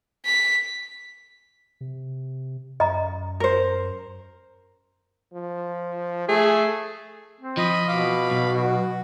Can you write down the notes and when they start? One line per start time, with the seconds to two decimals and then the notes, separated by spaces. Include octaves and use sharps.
0.25 B6
1.81 C3
2.80 F#2 D#5 A#5
3.40 A#4 C5
5.33 F3
6.29 A3 G#4
7.40 C4
7.57 F3 D#5 B5
7.88 B2 F5 B5 D6
8.31 B1
8.54 F#4